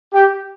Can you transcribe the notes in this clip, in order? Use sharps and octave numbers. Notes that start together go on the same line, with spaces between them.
G4